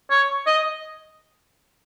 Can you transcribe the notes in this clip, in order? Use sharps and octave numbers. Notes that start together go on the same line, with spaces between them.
C#5
D#5